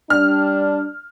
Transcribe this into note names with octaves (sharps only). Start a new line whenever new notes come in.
G3 D4 F6